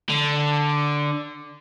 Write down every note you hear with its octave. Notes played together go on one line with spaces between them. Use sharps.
D3